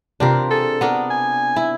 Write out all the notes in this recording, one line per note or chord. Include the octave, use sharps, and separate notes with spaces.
C3 C4 D4 F4 G4 A#4
G#4 A4
B3 D4 A#4
G#5
E4